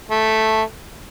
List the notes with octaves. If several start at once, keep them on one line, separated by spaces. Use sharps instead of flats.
A3